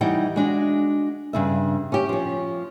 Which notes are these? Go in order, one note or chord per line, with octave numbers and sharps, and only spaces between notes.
E3 G3 D#4 F#5 G5
G#3 D4 F#4
G2 C#3 E5
C#4 G4
F3 C#4